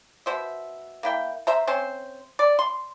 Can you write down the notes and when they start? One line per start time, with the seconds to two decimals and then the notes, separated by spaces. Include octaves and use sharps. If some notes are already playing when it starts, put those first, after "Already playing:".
0.26 B2 C5 E5
1.03 A#3 E4 G5
1.47 C5 E5 A#5
1.67 C4 C#4 C5
2.39 D5
2.59 C6